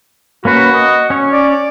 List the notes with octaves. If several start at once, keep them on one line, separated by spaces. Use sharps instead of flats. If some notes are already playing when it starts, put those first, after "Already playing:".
A#3 C#4 F#4 B4
D#5
C#4 C#5
D5